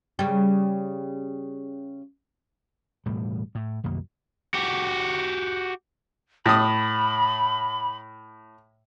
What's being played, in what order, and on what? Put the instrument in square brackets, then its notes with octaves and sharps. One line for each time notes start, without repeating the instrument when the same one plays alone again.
[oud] C#3 G3
[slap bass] E1 A2 G3
A2
C2 F#2 D#3 A#3
[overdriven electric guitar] F#4 G4
[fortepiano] A2 D#6 [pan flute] B5